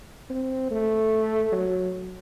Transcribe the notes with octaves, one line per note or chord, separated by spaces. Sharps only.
C4
A3
F#3